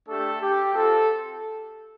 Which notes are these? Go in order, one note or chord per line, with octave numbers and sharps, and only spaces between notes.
A3 D4 G4 A4
G4
C4 F4 A4